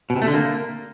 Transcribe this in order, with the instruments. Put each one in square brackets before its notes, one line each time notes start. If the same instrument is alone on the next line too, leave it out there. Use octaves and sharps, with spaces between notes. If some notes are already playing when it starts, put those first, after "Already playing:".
[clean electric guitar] B2
C3
A3
D3
A#3